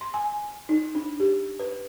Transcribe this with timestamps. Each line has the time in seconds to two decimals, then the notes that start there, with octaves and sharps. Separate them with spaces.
0.01 C6
0.14 G#5
0.69 D#4
0.95 D4
1.20 G4
1.59 B4